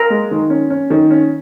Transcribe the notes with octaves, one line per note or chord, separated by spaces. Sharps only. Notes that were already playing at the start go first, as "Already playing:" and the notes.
Already playing: A#4
G#3
D#3
C#4
C#4
D#3
C#4